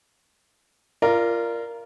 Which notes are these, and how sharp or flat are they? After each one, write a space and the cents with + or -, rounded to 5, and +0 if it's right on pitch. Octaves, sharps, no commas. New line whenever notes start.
F4 -20 A#4 +0 D5 +0